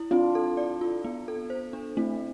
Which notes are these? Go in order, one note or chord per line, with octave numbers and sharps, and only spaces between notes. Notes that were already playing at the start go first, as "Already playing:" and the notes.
Already playing: E4
C4 D4 F4
A4
D5
F4
B3
A4
C5
D4
A3 C4 E4